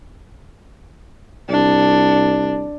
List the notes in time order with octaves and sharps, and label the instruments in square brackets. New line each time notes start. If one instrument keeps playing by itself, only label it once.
[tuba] C2 [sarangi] D4